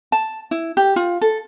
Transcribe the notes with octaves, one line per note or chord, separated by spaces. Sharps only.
A5
E4
G4
F4
A4